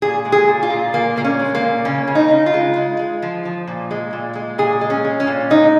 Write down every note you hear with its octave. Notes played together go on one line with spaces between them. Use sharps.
A#2 G#4
G#3
G#4
A#2
F4
A#2
A#2 A#3
A#2 A#3
C#4
G#3
A#3
A#2
C#3 C#4
C#3
D#4
C#3
F4
G#3
G#3
G#3
F3
F3
A#2
G#3
A#2
G#3
A#2 G#4
G#3
C#4
G#3
C#4
A#2
G#3 D#4